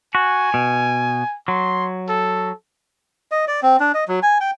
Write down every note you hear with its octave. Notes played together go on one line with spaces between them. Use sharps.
F#4 G#5
B2
F#3 C6
A4
D#5
D5
C4
D4
D#5
F#3
G#5
G5